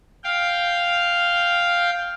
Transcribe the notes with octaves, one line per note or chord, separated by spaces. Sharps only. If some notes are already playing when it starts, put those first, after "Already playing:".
F5 G5